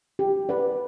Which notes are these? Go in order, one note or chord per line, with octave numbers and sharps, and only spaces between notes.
G4
B4 D5 F#5